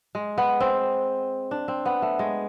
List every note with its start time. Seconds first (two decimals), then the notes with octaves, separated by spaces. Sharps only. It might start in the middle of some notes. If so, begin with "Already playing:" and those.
0.15 G#3
0.38 B3
0.60 C4
1.51 D4
1.68 C4
1.85 B3
2.02 A3
2.19 G#3